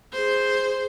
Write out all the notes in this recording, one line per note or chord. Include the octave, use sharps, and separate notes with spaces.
G#4 C5